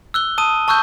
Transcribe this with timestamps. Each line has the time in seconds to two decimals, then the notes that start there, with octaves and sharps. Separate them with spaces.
0.14 E6 F#6 G7
0.38 A5 D#6 D#7
0.68 A5 C#6 E6 F#6 G6 G7